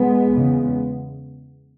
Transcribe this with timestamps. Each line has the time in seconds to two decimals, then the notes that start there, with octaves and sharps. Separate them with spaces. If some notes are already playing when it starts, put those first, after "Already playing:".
Already playing: G#3 B3
0.30 E2 C#3